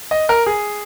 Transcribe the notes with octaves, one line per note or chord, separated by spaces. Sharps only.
D#5
A#4
G#4